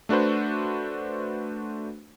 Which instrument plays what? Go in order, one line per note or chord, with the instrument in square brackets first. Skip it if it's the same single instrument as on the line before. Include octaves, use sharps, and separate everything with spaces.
[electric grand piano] A3 D4 F#4 B4 C5